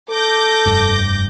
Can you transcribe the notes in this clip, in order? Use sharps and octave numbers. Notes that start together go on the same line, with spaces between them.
A4 D6 G6 A#6
F1 G2